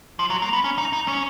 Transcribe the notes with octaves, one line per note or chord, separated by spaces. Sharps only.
F3
F#3
A#3
B3
C#4
D#4
D#4
C#4